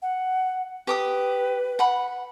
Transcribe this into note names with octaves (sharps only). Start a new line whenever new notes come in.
F#5
G4 B4 D6 D#6
F#5 B5